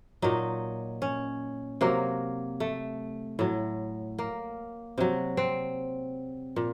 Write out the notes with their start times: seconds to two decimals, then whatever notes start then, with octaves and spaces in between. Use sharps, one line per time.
0.22 A#2 F#3 D#4
1.02 C#4
1.81 C3 F#3 A#3
2.60 A3
3.39 A2 F#3
4.18 A#3
4.98 C3 F#3
5.37 C4
6.56 A#2